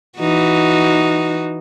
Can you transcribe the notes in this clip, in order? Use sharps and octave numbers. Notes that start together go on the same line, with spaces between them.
E3 D#4 F#4